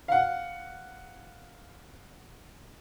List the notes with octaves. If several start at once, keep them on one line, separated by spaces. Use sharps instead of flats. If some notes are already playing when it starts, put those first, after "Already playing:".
F5 F#5